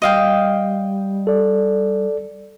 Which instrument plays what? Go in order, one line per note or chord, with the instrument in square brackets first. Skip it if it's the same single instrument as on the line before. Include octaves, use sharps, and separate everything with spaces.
[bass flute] G3 [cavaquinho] D#5 F5 G5
[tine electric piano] A4 D5